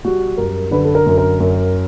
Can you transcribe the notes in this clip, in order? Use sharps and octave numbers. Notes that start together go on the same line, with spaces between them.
G3 F#4
F#2 A#4
D3 B4
A4
A#4
F#2
A#4
F#2